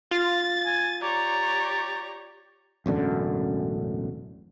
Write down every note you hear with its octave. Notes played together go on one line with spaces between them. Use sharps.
F4 A6
G#5
G4 C#5 D5 A#5
E1 A1 F#2 D3